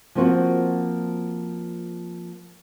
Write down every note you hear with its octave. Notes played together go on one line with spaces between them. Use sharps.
F3 A#3 C4 F4 F#4